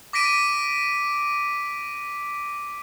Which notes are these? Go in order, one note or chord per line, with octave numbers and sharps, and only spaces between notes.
D6 A#6 B6 D7 D#7